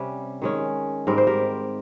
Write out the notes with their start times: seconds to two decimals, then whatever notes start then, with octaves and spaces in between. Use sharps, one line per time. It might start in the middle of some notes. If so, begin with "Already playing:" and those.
Already playing: C3 G3 C#4
0.42 D#3 G#3 C#4
1.07 G#2 G3 C4 A#4
1.18 C5
1.27 G4 A#4